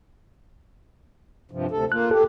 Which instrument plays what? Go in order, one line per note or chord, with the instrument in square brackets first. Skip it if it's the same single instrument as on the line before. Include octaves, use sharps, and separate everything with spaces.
[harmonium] G2 C3 F3
D2 C3 A4
[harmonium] A#3 F4 [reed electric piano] F#6
[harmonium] G4 [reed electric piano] A4